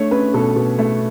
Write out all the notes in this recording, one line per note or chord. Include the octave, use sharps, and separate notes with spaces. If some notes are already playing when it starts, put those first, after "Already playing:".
Already playing: A3 D4 C#5
C#4 B4
B2 A4
B2
A3